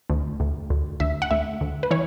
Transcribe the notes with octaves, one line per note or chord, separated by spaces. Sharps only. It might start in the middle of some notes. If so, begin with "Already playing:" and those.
D2
D2
D2
D2 E5
F#5
D2 E5
D2
B4
E3 C#5